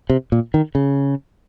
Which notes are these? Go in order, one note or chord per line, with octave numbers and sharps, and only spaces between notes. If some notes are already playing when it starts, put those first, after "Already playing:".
C3
A#2
D#3
C#3